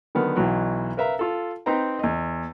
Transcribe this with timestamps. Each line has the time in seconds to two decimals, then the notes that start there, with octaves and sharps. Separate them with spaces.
0.15 D3 D#3 F#3 B3 F6
0.37 B1 B2 E3 F#3
0.97 A#4 B4 E5 F5 A#5
1.19 F4 A4
1.66 C4 D#4 B4 G5 A#5
1.99 E2 D#5